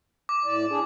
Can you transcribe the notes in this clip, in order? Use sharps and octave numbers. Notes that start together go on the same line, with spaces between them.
D6
A2 D5
D4 G#4